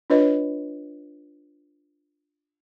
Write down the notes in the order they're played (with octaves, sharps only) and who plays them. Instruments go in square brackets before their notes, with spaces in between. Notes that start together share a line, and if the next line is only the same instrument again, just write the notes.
[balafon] D4 F4 B4 C#5 D#5